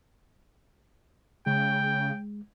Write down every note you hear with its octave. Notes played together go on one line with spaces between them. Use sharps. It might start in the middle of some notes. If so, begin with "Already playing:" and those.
C#3 G#3 G5